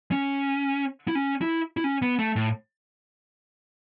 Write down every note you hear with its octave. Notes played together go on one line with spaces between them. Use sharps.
C#4
E4
C#4
E4
E4
C#4
B3
A3
A2